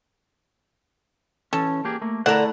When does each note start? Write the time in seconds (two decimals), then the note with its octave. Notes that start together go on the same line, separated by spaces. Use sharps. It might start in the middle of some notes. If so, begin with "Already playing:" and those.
1.53 E3 C#4 A4
1.85 A#3 G4 G#4
2.02 A3 A#3
2.26 D3 A3 E4 A#4 F#5 A5 A#5